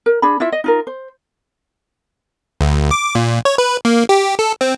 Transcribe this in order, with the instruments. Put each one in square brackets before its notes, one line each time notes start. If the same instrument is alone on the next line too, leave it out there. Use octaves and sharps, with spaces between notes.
[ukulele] A#4
D4 G#4 B5
E4 F4 E5
D#5
D#4 F4 A#4
C5
[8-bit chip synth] D2
D6
A#2
C#5
B4
A#3
G4
A4
C4